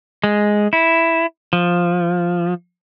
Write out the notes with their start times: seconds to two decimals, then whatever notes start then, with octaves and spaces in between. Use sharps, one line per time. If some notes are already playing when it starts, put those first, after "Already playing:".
0.24 G#3
0.73 E4
1.53 F3